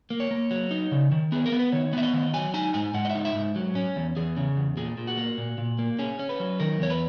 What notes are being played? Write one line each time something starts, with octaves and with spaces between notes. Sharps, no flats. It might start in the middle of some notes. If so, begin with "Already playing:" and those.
A#3
C#5
A#3
F#3
D#4
C#3
D#3
B3 G#4
A#4
B3
B4
D#3 C#5
B3 E5
D#5
D#3
F#3 G#5
D#4 G#5
G#2 G#5
G#2 F#5
D#5
E5
D#4
E5
G#2
F#3
C#4
E2
E2 G#4
C#3
E2
A#2 G#4
A#2
F#4
A#3
A#2
A#2
A#3
C#4 G#4
C#4
B4
F#3
D#3 A#4
E2 C#5
B4